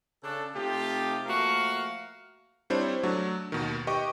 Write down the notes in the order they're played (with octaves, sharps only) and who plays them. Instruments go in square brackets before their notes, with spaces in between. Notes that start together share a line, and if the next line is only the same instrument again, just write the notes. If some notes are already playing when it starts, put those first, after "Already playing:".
[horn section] C#3 D4 A4
C3 A3 C4 D#4 F4 G4
F3 A3 A#3 F#4 A#4 F5
[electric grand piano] G3 C4 D4 E4 C5 C#5
F#3 A3 D4 F#4
D#2 B2 D#3
G4 B4 D#5 G5 C#6 D6